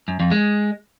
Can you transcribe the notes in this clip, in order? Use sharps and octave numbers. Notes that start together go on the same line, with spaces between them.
F#2
F2
G#3